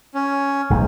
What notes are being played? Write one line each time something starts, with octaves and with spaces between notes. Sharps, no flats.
C#4
D1 B1 F#2